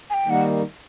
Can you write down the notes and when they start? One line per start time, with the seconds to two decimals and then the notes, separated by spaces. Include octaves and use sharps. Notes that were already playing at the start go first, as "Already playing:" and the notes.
0.10 G#5
0.14 G5
0.26 D#3 G3 A#3 D#4 F#5